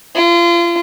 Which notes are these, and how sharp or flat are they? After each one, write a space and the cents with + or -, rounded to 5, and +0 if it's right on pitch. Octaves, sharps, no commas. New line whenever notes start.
F4 -30